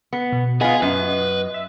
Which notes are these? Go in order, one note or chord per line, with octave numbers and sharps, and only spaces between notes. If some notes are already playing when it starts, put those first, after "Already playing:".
B3 C#7
B2
B3 F4 G#4 D#5 G#5
F#2 B4
E5